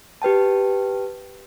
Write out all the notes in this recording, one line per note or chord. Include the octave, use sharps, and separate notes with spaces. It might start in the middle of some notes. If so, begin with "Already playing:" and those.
G4 B4 G5 A5